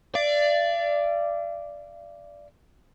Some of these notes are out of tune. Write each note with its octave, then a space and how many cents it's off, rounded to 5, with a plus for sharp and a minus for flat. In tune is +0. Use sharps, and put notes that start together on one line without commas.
D5 +0 F5 -45